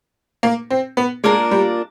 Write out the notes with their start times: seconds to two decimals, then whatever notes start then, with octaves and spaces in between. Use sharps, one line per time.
0.43 A#3
0.70 C4
0.97 B3
1.24 G#3 A#3 D4 F4 A#4
1.51 G3